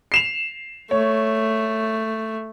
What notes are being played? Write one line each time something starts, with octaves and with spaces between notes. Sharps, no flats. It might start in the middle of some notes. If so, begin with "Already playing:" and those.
C7 E7 F7
A3 C#5